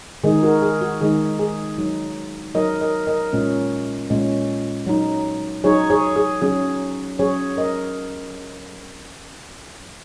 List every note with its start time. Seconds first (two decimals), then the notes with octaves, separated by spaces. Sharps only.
0.24 D#3 G#3 D#4 G#4
0.43 F#4 A#4
0.62 G#4
0.81 F#4
1.01 D#3 G#3 D#4 G#4
1.39 G#4
1.78 F#3 D#4
2.55 F#3 D#4 A#4 D#5
2.81 A#4 D#5
3.07 A#4 D#5
3.33 A#2 G#3 C#4
4.10 A#2 G#3 C#4
4.87 F#3 D#4
5.64 F#3 D#4 G#4 C#5
5.90 G#4 C#5
6.16 G#4
6.42 F#3 C#4 G#4
7.19 F#3 C#4 G#4 C#5
7.57 A#4 D#5